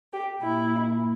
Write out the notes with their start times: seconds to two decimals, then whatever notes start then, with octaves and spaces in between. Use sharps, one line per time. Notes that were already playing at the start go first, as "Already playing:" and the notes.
0.13 G4
0.42 A#2 E4